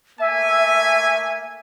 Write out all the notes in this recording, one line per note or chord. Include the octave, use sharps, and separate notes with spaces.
A3 A#3 E5 G#5